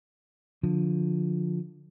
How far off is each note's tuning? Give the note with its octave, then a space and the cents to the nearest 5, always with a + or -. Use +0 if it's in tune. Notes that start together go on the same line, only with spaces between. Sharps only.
D3 +0 F3 +20